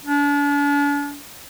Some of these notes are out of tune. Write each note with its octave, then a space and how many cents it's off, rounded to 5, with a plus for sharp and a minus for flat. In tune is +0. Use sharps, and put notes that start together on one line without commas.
D4 -40